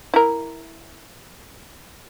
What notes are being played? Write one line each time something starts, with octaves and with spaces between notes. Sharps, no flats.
E4 A#4